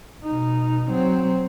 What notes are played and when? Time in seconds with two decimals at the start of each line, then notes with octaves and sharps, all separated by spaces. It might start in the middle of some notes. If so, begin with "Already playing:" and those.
0.24 B2 D#4
0.91 F#3 C4